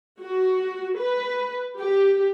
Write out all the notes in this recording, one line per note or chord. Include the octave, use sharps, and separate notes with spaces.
F#4
B4
G4